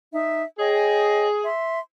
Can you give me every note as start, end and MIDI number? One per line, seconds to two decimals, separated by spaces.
0.13 0.43 63
0.13 0.43 76
0.59 1.47 68
0.59 1.27 73
0.59 1.27 75
0.59 1.27 79
1.44 1.79 76
1.44 1.79 84